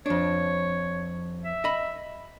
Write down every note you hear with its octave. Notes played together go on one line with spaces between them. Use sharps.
F2 D4 C#5
E5
D#5 B5